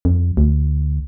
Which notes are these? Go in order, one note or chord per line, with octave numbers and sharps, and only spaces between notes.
F2
D2